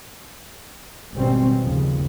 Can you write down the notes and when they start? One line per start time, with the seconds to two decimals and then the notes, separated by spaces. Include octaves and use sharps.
1.15 G#1 B2 G3 C4 C#4
1.63 G1 D#2 C#3 F3